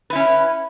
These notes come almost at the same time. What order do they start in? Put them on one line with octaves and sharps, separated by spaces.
B4 E4 C#4